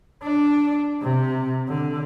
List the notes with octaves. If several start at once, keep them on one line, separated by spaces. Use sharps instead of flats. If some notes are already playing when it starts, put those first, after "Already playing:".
D4
C3
D3